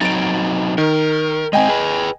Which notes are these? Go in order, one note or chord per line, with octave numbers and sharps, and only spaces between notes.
F#3 C4 D#4 A6 D7
D#3 A#4
G#3 B3 C4 D#5 G5 G#5
G#4 B4